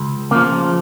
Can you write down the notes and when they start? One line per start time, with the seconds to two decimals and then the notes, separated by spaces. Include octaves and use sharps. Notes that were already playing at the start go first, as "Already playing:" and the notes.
Already playing: C#2
0.31 C#3 F3 A#3